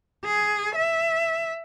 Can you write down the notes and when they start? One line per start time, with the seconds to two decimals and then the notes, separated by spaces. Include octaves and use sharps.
0.25 G#4
0.75 E5